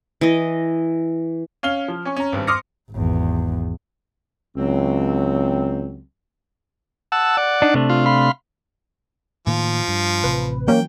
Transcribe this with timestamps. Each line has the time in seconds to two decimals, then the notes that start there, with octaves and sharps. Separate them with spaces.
0.21 E3 D#5
1.63 C#4 F5 F6 G7
1.88 F3
2.05 C#4 G#5 C#6
2.17 C#4 A#5
2.32 G#1 G2
2.47 C6 D6 D#6 F6 A#6 C#7
2.91 G#1 E2
4.57 C#2 F#3 C4
7.12 F#5 A5 E6
7.37 D5 F#5
7.62 D4 D#4
7.74 C3 A3 D4
7.90 F4
8.06 F5 B5 C6
9.47 A2 D#3 F3 A#3
9.88 G2
10.24 A1 C3 B4
10.68 E3 F#3 G3 A#3 C#4 G5